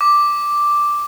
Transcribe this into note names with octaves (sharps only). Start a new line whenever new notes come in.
D6